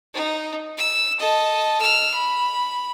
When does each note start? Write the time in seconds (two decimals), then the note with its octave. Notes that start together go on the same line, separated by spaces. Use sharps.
0.14 D#4
0.78 E6
1.19 A4 D#5
1.81 E6 F6
2.14 B5